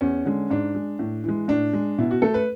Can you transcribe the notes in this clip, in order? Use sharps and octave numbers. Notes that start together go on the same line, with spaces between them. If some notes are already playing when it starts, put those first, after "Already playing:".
E2 C#4
D3 G#3
G#2 D4
G#3
A2
E3 G#3
A2 D4
G#3
B2 E4
F#4
A3 A4
B4